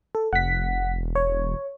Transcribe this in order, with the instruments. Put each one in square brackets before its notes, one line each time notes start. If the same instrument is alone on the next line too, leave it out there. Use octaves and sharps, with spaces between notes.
[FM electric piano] A4
[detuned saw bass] F1 [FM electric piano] F#5 B6
[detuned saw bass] E1
[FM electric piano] C#5